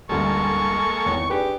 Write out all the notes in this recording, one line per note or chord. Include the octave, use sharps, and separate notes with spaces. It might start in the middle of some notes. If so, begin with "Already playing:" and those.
A1 D2 G2 G#3 A#3 A4 C#6
G#1 E2 C#5
D4 G4 G#4 B4